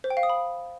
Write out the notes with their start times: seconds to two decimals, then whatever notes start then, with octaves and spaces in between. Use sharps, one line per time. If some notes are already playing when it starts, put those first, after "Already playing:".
0.04 C5
0.10 G5
0.17 F5
0.23 D#6
0.30 B5